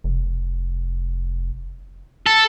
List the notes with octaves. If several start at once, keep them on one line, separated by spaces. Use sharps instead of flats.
F1
A4